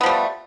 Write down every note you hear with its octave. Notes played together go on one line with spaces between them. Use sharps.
F3 G3 A3 B3